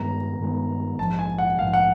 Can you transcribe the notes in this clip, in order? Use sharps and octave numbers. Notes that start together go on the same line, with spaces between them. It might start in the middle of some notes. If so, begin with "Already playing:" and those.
Already playing: G2 D#3 G#3 B3 A#5
G2 D#3 G#3 B3
A#1 G#2 F3 A5
G#5
F#5
A#1 G#2 F3 F5
F#5